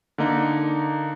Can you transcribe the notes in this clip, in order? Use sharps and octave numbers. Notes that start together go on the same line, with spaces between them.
D3 A#3 D#4